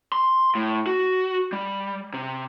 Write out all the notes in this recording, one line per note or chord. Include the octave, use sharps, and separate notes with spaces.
C6
A2
F#4
G3
C3